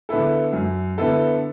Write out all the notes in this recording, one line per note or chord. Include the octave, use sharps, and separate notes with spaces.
D3 B3 E4 A4
F#2
D3 B3 E4 A4